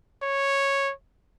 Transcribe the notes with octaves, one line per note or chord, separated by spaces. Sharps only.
C#5